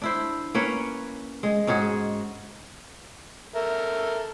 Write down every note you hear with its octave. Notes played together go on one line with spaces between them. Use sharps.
D4 E4 C5
A#3 C#4 B4 C#5
G#3
G#2 C#4 F#4 G#4
A4 A#4 E5